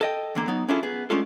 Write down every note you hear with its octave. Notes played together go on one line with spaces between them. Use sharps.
A4 D#5 G5
E2 D3 A#3
F#3 B3 D#4
C#4 D4 E4 F4 G#4 A4
B3 G#4
G#3 A3 C#4 D4 F4 A4